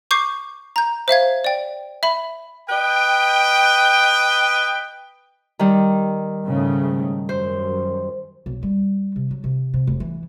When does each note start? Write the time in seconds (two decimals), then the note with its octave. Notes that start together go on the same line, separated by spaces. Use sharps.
0.11 C#6 D6 G6 C7
0.76 A#5 G6
1.08 C5 E5 F5 G#6
1.44 D5 G5
2.03 E5 B5
2.69 B4 D#5 G5
5.59 D#3 G3
6.45 G#2 C#3 A3
7.29 F#2 C5
8.46 B1
8.63 G3
9.16 C3
9.31 F#3
9.44 C3
9.74 C3
9.87 F1
10.00 E3